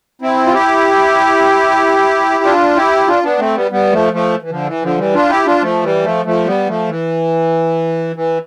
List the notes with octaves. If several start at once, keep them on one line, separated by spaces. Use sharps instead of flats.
C4 E4
F4
E4 G4
D4 F4
E4 G4
D4 F4
B3 D4
A3 C4
G3 B3
G3 B3
F3 A3
F3 A3
E3
D3 F3
E3
D3 F3
E3 G3
D4 F4
E4 G4
D4 F4
F3 A3
E3 G3
F3 A3
F3 A3
G3 B3
F3 A3
E3
E3